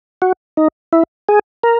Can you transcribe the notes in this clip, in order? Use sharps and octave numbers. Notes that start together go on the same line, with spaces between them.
F#4
D#4
E4
G#4
A#4